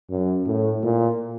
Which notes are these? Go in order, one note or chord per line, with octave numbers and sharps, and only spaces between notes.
F#2
A2
A#2